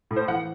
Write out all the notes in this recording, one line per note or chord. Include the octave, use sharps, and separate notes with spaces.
A2
C5
E3 F#5